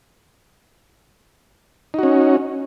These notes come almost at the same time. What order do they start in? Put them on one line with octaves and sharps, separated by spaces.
D#4 F#4 C#4